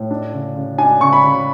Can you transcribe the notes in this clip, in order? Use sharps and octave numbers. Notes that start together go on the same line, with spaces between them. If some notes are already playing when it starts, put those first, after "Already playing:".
Already playing: A2
D4
C#3
C#3
D4 G#5
C#3 C#6
B5
C#3